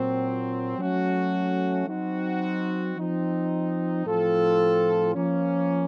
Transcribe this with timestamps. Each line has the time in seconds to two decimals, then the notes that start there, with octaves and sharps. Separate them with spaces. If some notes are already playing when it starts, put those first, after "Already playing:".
Already playing: A#2 F#3 C4
0.78 F#3 A3 C#4 F#4
1.88 F#3 C4 D#4 F#4
2.96 F3 C4 D#4
4.06 A2 F3 C4 F4 A4
5.15 F3 A#3 C#4